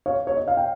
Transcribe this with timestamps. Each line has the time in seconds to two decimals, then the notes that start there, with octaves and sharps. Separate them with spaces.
0.06 C#5 F5
0.27 C#5
0.37 D#5
0.48 F5
0.57 G5